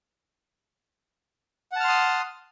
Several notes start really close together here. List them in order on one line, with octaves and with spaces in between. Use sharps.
F#5 A5 F6 C6 D#6